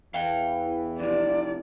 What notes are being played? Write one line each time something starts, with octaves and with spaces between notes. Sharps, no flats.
E2 E3 F5 G5
F2 C3 E4 D5